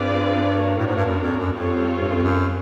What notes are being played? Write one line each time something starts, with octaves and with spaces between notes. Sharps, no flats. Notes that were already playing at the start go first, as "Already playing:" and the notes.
Already playing: G2 C4 F4 G#4 B4 D5
A#3 D4 F#4 A#4 C#5
A2
G#2
G2
F#2
F2
F#2
F2 G3 C4 F4 A4 C#5
G2
F#2
F2
F#2